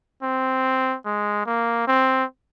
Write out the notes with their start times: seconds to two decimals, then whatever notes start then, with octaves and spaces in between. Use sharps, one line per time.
0.23 C4
1.05 G#3
1.46 A#3
1.87 C4